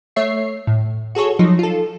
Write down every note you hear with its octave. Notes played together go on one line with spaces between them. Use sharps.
A3 C#5 E5 C7
A2
F#4 G#4 A4 C#5
F3 F#3 D#4
F4 A4